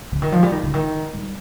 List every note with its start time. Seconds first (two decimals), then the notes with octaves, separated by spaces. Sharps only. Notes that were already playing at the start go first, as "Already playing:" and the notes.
0.12 C#3
0.22 D#3
0.32 F3
0.43 G3
0.52 D#3
0.63 C#3
0.74 D#3
1.14 G3